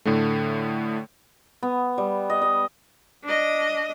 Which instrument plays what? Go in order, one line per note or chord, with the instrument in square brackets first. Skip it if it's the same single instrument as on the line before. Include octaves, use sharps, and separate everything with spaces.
[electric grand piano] A2 D3 A3
[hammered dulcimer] B3
G3
D#5
D#5
[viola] D4 D#5